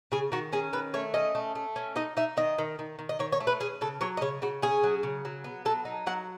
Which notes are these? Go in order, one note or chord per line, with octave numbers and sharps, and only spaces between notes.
C#3 G#4
D#3 F#4
C#4 G#4
D#3 B4
A3 C#5
C#4 D#5
A3
A3
C#4
D#4 D#5
D#4 E5
D#3 D#5
D#3
D#3
D#3
D#5
D#3 C#5
C#5
A3
B4
C#4 G#4
C#3 A4
F#3 C#5
D#5
C#3 C#5
C#3 F#4
C#4 G#4
F#3
C#3
F#3
B3
F#3 A4
D#4
F#3 F#5